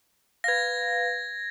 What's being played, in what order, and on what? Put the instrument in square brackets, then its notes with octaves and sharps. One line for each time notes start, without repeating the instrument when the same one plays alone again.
[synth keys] B4 F5 [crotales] G#6 A#6